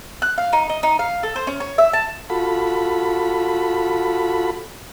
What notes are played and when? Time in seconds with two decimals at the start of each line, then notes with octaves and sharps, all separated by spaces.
0.22 F#6
0.38 F5
0.53 D#4
0.69 D#5
0.83 D#4
0.99 F5
1.23 A4
1.36 C5
1.47 C#4
1.60 C#5
1.78 E5
1.93 A5
2.30 F4 F#4 A4 B5